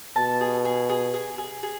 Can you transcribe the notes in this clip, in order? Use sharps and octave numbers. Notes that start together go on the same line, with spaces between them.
B2 A5
G#4
G#4
G#4
G#4
G#4
G#4